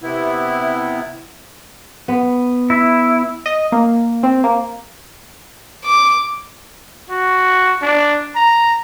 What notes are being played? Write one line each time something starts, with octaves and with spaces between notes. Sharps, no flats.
C3 B3 E4
B3
E4
D#5
A#3
C4
A#3
D6
F#4
D4
A#5